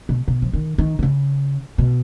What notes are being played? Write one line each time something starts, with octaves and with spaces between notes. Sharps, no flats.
B2
B2
F3
D#3
D#3
D#3
C#3
B2